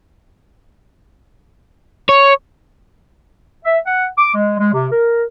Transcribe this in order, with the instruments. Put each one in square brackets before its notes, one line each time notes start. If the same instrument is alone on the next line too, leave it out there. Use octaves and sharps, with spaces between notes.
[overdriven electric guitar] C#5
[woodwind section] E5
F#5
D6
G#3
G#3
C3
A#4